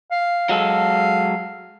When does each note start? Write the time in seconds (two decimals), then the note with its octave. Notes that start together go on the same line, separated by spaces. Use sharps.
0.11 F5
0.49 F#3 G#3 A4